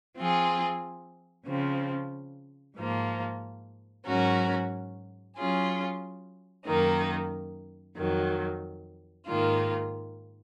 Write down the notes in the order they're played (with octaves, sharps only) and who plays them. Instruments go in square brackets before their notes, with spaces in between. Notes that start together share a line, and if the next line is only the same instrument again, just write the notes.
[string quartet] F3 C4 F4 G#4
C#3 F3 C4
G#2 F3 A#3
G#2 F#3 C#4 F#4 A#4
F#3 C#4 F4 G#4
F#2 D#3 A#3 D#4
F2 D#3 F#3
G#2 D#3 A#3 F4